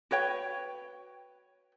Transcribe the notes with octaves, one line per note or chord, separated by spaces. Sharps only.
F#4 B4 C#5 G5